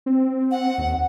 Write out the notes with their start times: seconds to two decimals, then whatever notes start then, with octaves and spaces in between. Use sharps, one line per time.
0.06 C4
0.52 F#5
0.78 D#2